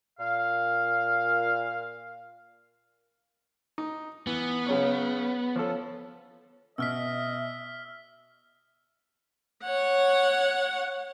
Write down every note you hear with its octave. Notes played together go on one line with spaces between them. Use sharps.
A#2 F5
D#4
E3 B3
C#3 F#3 C#4
F3 C#4 A4
B2 D#5 E5 E6 F6 B6
C#5 F#5